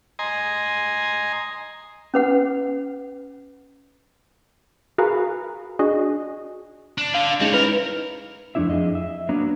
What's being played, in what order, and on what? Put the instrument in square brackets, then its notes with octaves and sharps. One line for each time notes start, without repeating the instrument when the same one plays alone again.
[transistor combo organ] D#5 G#5 A#5 C6
[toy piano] C#4 B4 F#5
[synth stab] F#4 G#4 A#4 B4 F5
D4 F#4 G#4 D#5
[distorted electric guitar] D4
[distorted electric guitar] D3 [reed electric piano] F5
[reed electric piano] G#3 C#4 D#4 [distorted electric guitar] C4 C#5
[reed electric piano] D#4 E4 B4 [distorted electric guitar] A#4
[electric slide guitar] F2 A3 D4 E4 E5
F2 G#4 D#5
E5
F#3 A#3 B3 D4 A#5